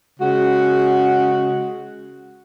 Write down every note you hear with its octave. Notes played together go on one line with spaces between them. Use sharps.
C#3 G#3 F#4